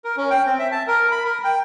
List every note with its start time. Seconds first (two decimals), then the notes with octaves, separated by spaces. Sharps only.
0.04 A#4
0.17 C#4
0.30 G5
0.46 C4
0.59 E5
0.72 A5
0.87 A#4
1.11 B5
1.25 A#4
1.44 G5